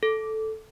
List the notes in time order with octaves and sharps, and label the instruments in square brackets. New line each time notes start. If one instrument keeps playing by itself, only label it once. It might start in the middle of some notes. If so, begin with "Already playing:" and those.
[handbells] A4